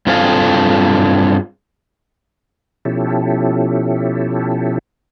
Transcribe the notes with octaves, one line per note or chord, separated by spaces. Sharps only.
G2 C4 F4 G#4 A4 F5
B2 F3 C#4 E4 G4 A4